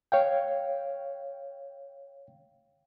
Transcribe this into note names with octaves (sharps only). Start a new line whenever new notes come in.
C#5 F5 G5